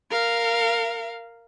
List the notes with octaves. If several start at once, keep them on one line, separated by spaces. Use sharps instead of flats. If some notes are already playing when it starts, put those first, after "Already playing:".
A#4 F5